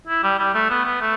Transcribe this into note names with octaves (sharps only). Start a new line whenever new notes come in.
E4
G3
G3
A3
B3
B3
A3